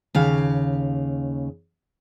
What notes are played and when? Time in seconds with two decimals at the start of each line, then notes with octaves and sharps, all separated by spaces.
0.15 D#2 C#3 F5